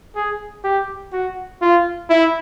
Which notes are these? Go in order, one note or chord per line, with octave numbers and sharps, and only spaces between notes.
G#4
G4
F#4
F4
E4